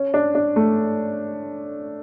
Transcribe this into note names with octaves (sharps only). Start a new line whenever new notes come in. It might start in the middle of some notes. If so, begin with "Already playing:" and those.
Already playing: C#4
D4
D4
A3